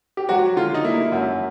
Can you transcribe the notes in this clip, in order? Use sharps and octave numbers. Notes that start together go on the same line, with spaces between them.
G4
F#3 F#4
D3 F4
D#4
A#3 E4
F#2